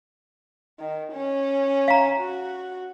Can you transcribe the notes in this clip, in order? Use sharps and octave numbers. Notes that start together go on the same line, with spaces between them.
D#3
C#4
F5 A#5
F#4